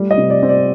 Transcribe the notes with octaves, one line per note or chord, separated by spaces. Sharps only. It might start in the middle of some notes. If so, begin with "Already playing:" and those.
Already playing: G3 A3
D#5
C3
D5
C4
D5